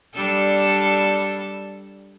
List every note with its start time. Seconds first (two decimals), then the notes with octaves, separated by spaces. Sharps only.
0.15 G3 D4 A4